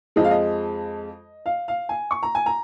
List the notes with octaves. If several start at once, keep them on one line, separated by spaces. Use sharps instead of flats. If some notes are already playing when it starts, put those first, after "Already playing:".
F2 F3 G#3 D#5
F5
D#5
F5
F5
G#5
C#6
A#5
G#5
A#5